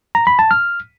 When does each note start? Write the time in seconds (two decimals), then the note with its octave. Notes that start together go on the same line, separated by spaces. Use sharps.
0.15 A#5
0.27 B5
0.39 A5
0.51 F6